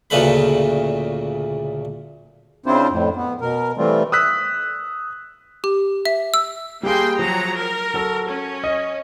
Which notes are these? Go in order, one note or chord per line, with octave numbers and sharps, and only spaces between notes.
D2 A#2 C#3 A3 B4 B5
C#3 C4 D4 E4 F4 C5
F2 A2
B3
B2 A#4
E3 G3 A3 C4 F4
D#6 E6 F#6 B6
G4
E5
E6
G3 A#3 G#4 G5 C6
F3 F#3 A#5
A#4
F#3 A4
C#4
D#5